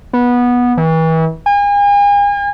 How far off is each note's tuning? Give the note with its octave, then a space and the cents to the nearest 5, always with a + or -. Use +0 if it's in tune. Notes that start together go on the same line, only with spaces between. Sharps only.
B3 -15
E3 -35
G#5 -40